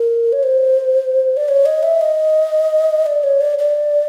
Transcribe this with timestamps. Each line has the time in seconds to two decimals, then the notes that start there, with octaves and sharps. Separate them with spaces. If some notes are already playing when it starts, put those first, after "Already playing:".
Already playing: A#4
0.32 C#5
0.43 C5
1.37 D5
1.49 C#5
1.66 D#5
1.83 E5
2.01 D#5
3.06 D5
3.23 C#5
3.41 D5
3.59 D5